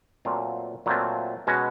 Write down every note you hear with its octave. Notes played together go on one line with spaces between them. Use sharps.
A#2 F#3 A3 C4 F4
A#2 F#3 A3 C4 F4
B2 G#3 C#4 F#4